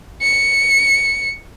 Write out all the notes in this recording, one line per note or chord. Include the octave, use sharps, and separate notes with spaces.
C#7